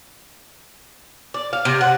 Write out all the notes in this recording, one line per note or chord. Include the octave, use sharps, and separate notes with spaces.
D5
F5
C3
F#5